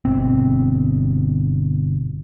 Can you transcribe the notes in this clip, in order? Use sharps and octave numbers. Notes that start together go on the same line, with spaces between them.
G1 B2 C4